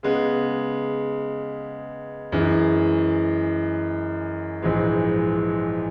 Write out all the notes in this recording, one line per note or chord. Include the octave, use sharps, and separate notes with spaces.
C#3 G#3 B3
F#2 E3 G#3
A#1 G#2 E3 G#3